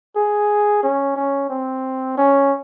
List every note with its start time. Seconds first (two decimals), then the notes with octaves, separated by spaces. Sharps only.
0.16 G#4
0.83 C#4
1.16 C#4
1.50 C4
2.18 C#4